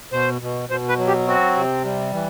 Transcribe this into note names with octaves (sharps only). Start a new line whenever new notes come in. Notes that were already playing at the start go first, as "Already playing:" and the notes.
B2 C5
B2
B2 C5
B4
F#3
G4
C4 F#4
C3
G3
E3